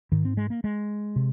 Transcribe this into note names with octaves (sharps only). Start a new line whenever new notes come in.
G#2 D#3
C4
G#3
A#3
G#3
C3